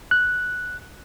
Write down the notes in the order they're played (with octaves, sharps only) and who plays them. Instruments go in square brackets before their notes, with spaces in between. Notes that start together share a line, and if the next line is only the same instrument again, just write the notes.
[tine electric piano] F#6